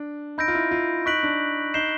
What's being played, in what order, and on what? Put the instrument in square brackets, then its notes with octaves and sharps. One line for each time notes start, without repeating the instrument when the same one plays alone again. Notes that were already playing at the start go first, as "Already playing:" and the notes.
Already playing: [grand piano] D4
[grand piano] D#4 [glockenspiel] B5 E6 G6 A#6 D7
[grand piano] F4
E4
F4
[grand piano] D#4 [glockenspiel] C#6 F#6 B6 D7 F#7
[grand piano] D4
[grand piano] D#4 [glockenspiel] G6 C7 E7 G7